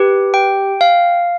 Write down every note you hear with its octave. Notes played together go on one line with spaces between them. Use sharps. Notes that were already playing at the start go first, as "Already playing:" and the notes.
Already playing: G4 B4
G5
F5